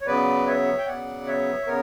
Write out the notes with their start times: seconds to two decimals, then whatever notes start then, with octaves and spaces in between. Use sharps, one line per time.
0.01 C#5
0.06 C#3 F#3 B3 B4 D5
0.47 C#5 E5
0.78 G5
0.86 C#3 F#3 B3 D5 F#5
1.27 C#5 E5
1.66 C#3 B3 A#4 C#5